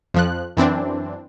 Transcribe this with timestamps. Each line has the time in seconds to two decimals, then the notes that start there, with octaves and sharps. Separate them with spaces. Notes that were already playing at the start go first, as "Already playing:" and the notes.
0.14 F2 F3 F#6
0.57 F#2 E3 C4 D4